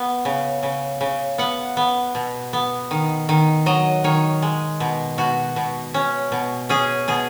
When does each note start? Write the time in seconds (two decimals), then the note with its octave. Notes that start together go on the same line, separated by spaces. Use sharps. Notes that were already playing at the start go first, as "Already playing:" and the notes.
Already playing: B3
0.25 C#3
0.63 C#3
1.01 C#3
1.38 B3 F#5
1.77 B3
2.15 B2
2.53 B3
2.91 D#3
3.29 D#3
3.66 F#3 D#5
4.04 D#3 C#5
4.42 G#3
4.80 B2
5.18 B2 F#4
5.56 B2
5.94 C#4
6.32 B2
6.69 C#4 G#4
7.08 B2 G#4